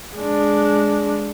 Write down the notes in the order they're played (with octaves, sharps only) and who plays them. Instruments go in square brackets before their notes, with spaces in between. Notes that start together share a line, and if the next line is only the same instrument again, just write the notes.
[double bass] G#3 D4